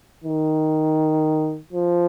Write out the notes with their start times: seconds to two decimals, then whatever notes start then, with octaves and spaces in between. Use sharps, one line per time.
0.24 D#3
1.73 F3